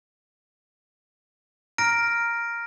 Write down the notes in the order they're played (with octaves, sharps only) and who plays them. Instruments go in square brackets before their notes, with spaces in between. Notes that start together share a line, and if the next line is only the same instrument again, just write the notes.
[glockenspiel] A#5 F6 A#6 D7